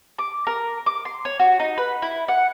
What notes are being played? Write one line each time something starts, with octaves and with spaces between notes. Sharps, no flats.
D6
A#4
D6
C6
C#5
F#4
D#4
B4
E4
F#5